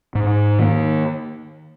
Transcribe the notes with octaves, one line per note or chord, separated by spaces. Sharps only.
G#2
D#3 A#3